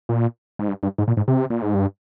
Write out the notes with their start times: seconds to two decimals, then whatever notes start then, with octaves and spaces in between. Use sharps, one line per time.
0.09 A#2
0.59 G#2
0.68 G2
0.83 G2
0.98 G#2
1.08 A#2
1.17 G#2
1.28 C3
1.50 A#2
1.62 G#2
1.74 G2